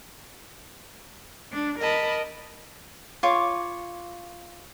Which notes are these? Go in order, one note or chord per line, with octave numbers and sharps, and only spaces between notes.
D4
A#4 D#5 A5 B5
F4 C#5 D6